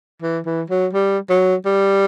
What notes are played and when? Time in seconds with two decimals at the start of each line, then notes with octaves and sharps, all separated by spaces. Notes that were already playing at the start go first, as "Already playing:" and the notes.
0.22 E3
0.45 E3
0.70 F#3
0.93 G3
1.30 F#3
1.66 G3